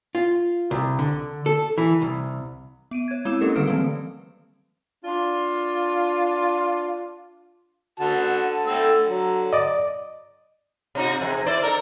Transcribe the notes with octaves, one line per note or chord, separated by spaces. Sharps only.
F4
C2
D3
A4
E3
C2
B3 D7 D#7
C#5 G#6
G#3 C4 E4 D6 E6 E7
A#3 C#4 G4 A4 A#4
D3 D#3 G3 B4 F6 D7
E3 F#3 G3 A3 C4
D4 F4
D3 F#4 A5
A3 G5 E6
F#3
D5 D#5
C3 D#4 F#4
F2 C3 G#3
E4 C5 D5
D#4 A4 A#4